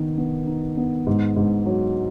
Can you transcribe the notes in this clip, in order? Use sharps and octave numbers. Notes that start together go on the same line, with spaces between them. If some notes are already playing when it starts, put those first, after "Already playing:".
Already playing: D#3 B3 D#4
B3
D#4
B3
G#2
G#2
F#3